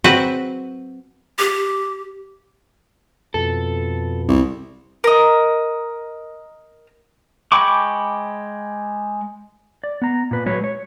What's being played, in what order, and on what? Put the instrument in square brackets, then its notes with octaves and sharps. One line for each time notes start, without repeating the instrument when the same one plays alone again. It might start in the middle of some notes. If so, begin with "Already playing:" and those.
[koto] F#3 C4 F#4 B4 F#5
[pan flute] G4
[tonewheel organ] F2 B2 [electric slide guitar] A4
[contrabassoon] C2
[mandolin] A#4 D#5
[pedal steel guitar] G#3 G5 B5 C#6 D6
[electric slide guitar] D5
B3 A#5
A#2 B4
F#3 G#3 B4 C#5
C#5